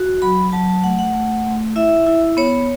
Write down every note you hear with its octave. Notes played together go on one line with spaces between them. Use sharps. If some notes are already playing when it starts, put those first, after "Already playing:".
Already playing: F#4
F#3 B5
F#3 A5
A5
A3 F#5
F#5
A3
A3
E4 E5
E4
B3 C#5